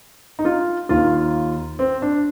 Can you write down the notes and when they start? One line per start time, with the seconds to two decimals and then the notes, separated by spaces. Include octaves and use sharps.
0.39 D#4
0.45 F4
0.89 D#2 D#3 F4
1.79 C4
2.02 D4